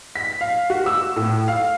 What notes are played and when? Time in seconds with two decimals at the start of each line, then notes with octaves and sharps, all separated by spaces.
0.16 B6
0.41 F5
0.70 F#4
0.86 E6
1.16 A2
1.48 F5